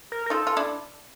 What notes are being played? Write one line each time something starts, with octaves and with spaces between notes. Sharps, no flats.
A#4
A#4
D#4 F4 A4
F4
D4 E4